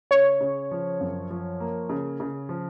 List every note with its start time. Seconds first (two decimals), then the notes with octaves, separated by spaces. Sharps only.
0.11 C#3 C#5
0.41 C#3
0.71 F3
1.01 F#2
1.30 F3
1.60 A#3
1.89 C#3
2.20 C#3
2.49 F3